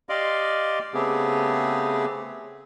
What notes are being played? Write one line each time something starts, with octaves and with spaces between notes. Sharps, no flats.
G4 D5 D#5 F5 C6 D6
C#3 A3 B3 C4 G4 G#4